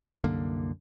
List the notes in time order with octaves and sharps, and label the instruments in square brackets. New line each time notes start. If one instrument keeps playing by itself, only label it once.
[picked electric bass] C2 F#2 D3 A#3